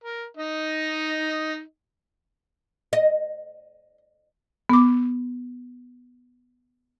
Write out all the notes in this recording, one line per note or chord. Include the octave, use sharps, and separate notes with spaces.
A#4
D#4 D#5
D#5
B3 D6